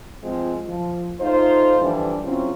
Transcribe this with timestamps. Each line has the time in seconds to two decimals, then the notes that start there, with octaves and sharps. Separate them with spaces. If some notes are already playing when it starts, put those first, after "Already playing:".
0.23 F3 G#3 C4 F4
0.66 F3
1.20 A3 D#4 F4 C5
1.81 D3 E3 F3 G3 D4
2.23 C#3 F#3 C4 C#4 E4 F4